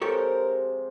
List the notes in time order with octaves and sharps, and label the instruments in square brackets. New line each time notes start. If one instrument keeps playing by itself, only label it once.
[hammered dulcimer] C3 F3 G#3 [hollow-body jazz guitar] G4 A4 C#5 [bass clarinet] A#4